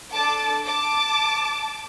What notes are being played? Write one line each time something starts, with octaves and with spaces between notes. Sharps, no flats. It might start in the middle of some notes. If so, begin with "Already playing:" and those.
D4 A4 A5 D6
A5 D6